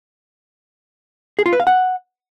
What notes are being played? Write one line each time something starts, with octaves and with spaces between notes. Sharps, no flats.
G#4
F4
B4
F5
F#5